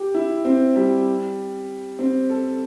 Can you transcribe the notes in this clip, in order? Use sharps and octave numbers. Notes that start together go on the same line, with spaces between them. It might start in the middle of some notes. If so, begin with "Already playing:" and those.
Already playing: G4
E4
C4
G3
C4
A4